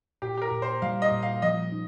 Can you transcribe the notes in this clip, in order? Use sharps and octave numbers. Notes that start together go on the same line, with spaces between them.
A#2 G4
G4
A#4
A#2
C5
G3 F5
D#5
A#2
F5
F3 D#5
D#4